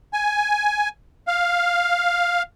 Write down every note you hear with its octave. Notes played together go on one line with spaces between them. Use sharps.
G#5
F5